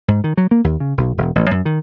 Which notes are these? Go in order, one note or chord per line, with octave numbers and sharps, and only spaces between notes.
G#2
D#3
F#3
A#3
D#2
C#3
B1
E1
A1
F#2
D#3